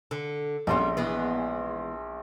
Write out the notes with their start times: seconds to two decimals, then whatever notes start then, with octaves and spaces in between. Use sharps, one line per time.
0.11 D3
0.67 A#1 G3 B3 C#4 C6
0.97 E3 G#3 B3